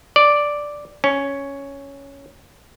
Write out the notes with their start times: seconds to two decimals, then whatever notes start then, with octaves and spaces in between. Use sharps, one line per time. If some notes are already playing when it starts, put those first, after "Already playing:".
0.16 D5
1.04 C#4